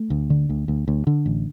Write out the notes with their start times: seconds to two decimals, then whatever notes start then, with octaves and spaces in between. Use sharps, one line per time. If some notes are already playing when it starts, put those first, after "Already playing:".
Already playing: A3
0.10 D2
0.30 D3
0.49 D2
0.68 D2
0.88 D2
1.07 D3
1.26 A1